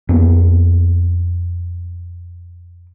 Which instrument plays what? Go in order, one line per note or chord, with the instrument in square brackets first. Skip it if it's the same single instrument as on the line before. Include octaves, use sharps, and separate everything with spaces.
[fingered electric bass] F2 A#3 B3